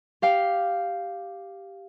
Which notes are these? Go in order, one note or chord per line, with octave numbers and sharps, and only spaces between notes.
G4 F5 G5